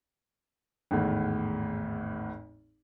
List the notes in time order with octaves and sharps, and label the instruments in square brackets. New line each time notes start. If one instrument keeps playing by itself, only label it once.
[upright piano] G#1 E2 A2